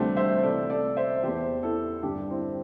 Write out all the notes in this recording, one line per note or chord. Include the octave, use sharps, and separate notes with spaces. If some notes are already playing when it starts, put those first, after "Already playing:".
Already playing: D2 C3 E3 G3 A3 C4 D4
C5 E5
C2 C3 E3 A4 D5
A4 D5
C5 E5
E2 E3 G4 C5
E4 A4
G2 D3 D4 G4
C4 E4